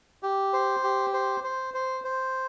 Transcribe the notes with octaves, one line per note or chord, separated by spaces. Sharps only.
G4
C5
G4
C5
C5
C5
C5